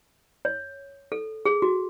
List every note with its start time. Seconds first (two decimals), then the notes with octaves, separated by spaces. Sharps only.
0.45 C#5
1.12 A4
1.45 G#4
1.62 F#4